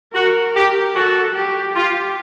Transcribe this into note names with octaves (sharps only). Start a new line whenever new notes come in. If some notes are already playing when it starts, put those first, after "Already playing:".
F#4 A#4
G4
F#4 A4
G4
F4 G4